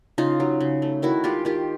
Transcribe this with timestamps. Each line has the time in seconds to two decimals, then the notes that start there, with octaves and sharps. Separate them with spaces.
0.18 C#3 D#4 F4
0.40 F#3
0.60 C#3
0.82 A3
1.02 D#3 E4 F#4
1.24 G#3 F4 G4
1.45 D#3 F4 G4